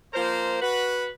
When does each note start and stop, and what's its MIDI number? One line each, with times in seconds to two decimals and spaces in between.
0.14 0.60 53
0.14 0.60 58
0.14 0.60 70
0.14 0.60 72
0.62 1.09 66
0.62 1.09 71